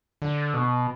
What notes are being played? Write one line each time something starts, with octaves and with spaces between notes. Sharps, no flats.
D3
B2